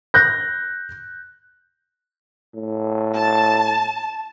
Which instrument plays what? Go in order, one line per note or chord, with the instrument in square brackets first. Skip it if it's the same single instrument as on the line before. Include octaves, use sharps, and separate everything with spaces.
[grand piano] F#6 G6 A#6
[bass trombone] A2
[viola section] A5